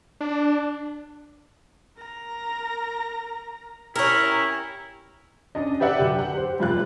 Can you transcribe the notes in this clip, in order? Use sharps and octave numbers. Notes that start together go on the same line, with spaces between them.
D4
A#4 A#5
C#4 E4 G4 A#4 A#5
C#4 D4 D#5
G4 B4 D5 E5 F#5
F#2 D3 G4
F#5
G4 C5
F1 G3 F4 F#6